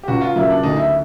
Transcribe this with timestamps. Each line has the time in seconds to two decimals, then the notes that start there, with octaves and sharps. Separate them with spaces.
0.03 G4
0.08 C#2 F#4
0.21 F4
0.35 C#3 F#3 A#3 E4
0.50 D4
0.63 D2 D#4
0.77 E4